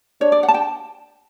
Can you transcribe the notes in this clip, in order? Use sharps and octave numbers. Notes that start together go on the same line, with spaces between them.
D4 C#5
D5
F#5
A5
G5